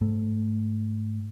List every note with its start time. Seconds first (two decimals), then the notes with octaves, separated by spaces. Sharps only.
0.01 G#2 A3